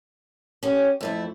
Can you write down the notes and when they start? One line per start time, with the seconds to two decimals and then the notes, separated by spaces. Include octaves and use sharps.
0.63 C#4 G4
1.01 F2 A3 E4